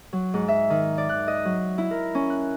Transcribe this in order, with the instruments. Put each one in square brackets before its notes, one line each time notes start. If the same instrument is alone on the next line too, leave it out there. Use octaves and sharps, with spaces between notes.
[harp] F#3
G#2
E5
D#3
D5
F#6
D#5
F#3
E4
A#4
C#4
F#6